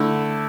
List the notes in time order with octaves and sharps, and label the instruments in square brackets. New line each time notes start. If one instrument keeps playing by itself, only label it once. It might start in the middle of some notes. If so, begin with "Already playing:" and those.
Already playing: [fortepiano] D3 A3 E4